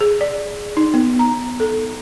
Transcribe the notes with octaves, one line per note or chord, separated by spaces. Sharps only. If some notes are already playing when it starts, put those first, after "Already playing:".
G#4
D5
D#4
B3
A#5
A4